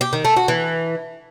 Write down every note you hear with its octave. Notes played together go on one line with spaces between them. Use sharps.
G4
D#3
A3
F#4
E3